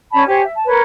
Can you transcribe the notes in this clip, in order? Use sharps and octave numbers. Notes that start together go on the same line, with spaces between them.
C#4 D5 A5 B5
G4 C5 C#5 G#5
E5
A5
A#4 B4 C#5